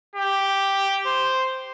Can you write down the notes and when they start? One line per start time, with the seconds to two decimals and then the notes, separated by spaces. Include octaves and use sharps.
0.15 G4
1.06 C5